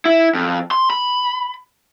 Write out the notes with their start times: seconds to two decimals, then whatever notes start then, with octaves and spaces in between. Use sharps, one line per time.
0.05 E4
0.34 F2
0.71 C6
0.90 B5